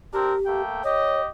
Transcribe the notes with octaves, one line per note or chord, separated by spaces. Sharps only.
C4 D4 G4 A#4
A3 A#3 G5
G4 C#5 D#5